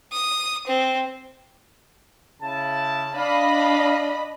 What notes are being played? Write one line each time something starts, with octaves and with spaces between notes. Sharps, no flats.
D#6
C4
C#3 E4 A5
D4 D#5 F5 B5